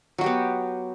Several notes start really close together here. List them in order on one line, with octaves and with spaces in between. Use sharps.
F#3 F#4 G4 B3